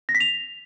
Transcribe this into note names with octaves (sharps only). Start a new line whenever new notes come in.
A#6
B6
F7